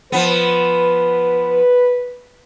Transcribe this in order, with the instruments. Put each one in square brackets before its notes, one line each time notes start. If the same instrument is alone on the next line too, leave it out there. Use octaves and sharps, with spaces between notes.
[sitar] F3 B3 [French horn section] B4